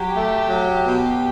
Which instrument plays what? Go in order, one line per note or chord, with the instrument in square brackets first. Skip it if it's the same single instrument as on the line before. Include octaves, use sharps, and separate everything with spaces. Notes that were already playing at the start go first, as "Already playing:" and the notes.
Already playing: [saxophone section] F#3 [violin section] G4
[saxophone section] A3
F#3
B2